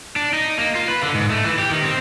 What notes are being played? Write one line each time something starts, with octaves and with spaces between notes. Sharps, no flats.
D4
D#4
A#3
F4
B4
D3
G#2
A3
E3
G4
D#3
C4